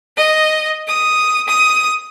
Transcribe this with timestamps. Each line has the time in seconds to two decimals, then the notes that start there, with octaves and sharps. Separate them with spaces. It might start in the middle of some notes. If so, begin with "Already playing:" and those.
0.19 D#5
0.88 D#6
1.48 D#6